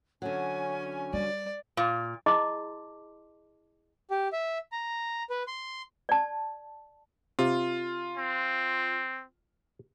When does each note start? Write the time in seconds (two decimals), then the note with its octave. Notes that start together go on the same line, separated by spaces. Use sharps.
0.22 D3 F#3 C#4 G#5
1.13 G3 D5
1.77 A#2
2.26 E4 G#4 D#5 A5 C6 D6
4.11 G4
4.33 E5
4.72 A#5
5.30 B4
5.47 C6
6.09 D5 A5
7.39 C3 F4
8.17 C4